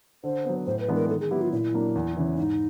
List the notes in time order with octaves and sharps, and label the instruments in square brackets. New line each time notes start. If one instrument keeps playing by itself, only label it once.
[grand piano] D3 [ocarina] C5
[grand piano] F#3 B3
[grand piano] A2 [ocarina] C5
[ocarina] B4
[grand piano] E3 G#3 B3 D4
[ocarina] A#4
[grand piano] D#3 [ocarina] A4
[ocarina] G#4
[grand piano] F#3 B3 E4 [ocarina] G4
[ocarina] F4
[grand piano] A#2 [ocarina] E4
[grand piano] F#3 A#3 D4
E2
C#3 E3
[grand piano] G#2 [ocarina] D#4